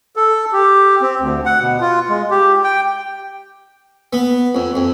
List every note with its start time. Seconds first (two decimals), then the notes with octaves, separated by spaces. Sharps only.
0.16 A4
0.52 G4
1.02 C4
1.20 D2
1.46 F#5
1.61 B2
1.81 F4
2.09 G#3
2.31 G4
2.64 G5
4.13 B3
4.55 F2
4.75 F2